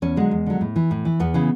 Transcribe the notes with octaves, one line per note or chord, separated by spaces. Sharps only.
E2 C#4
D3 F#3 G#3
E2
D3 F#3
A2
E3
A2
E3
E2 B3
C#3 E3